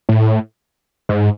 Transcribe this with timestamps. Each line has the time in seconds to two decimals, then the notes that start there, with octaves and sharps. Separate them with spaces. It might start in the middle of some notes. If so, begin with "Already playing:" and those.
0.09 A2
1.09 G#2